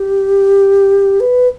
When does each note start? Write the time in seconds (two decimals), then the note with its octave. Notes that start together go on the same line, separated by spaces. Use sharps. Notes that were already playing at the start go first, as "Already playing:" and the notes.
Already playing: G4
1.20 B4